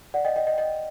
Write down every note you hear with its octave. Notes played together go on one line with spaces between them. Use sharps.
D5 F#5
D#5 G5
D#5 G5
D#5 G5
D#5 G5